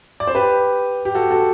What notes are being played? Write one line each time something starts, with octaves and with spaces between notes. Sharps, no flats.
D5
C5
G4 B4
G4
F#4 A4
F#4 A4